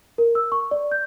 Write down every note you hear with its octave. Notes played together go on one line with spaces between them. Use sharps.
A#4
E6
C#6
D5
G6